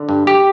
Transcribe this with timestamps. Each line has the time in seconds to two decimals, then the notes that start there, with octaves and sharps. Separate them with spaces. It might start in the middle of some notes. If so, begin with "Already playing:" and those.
Already playing: D3
0.09 G2
0.27 G4